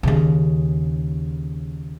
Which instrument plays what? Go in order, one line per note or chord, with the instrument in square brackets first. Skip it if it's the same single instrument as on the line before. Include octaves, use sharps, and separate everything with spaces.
[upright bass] D#2 C#3